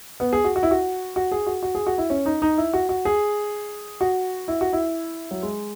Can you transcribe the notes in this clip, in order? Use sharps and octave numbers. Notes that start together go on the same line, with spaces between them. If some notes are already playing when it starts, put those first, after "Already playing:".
B3
G#4
F#4
F#4
E4
F#4
F#4
G#4
F#4
F#4
G#4
F#4
E4
C#4
D#4
D#4
E4
F#4
F#4
G#4
F#4
E4
F#4
E4
F#3
G#3